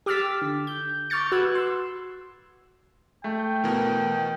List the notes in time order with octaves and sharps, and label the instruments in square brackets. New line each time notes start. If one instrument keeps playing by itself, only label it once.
[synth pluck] G4 D6 E6 F6 A6 B6
D3
G6
C#6 D6 F6 G6 A6 C#7
F#4 B4 E6 F#6 G#6
C6 E6
[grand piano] A3 [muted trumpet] G5
[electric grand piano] B2 A#4 [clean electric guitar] E3